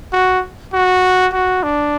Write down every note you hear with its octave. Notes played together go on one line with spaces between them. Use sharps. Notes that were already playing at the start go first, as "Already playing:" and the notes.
F#4
F#4
F#4
D4